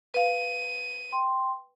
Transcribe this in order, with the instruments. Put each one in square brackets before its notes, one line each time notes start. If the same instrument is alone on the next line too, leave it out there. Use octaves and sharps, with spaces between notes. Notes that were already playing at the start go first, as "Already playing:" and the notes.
[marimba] B4 F5 [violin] D#7
[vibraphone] G5 C6